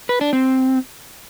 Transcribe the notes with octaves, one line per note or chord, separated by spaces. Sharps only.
B4
D4
C4